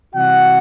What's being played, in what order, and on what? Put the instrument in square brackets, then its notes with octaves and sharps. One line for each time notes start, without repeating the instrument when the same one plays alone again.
[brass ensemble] C3 E3 G3 F#4 F#5